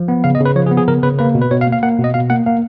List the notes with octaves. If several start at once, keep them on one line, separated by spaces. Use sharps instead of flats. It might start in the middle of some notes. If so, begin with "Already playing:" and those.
Already playing: F3
B3
C#3 F5
D#5
C#3
B4
F3 C#5
G#4
B3
G#4
C#3 A#4
C#3 B4
A#3 B4
B2
B4
B2 C#5
F5
A#3
F5
A#3 F#5
B2
D#5
B2 F5
A#3 F#5
A#3 F5